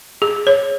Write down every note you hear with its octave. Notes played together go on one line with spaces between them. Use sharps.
G#4
C#5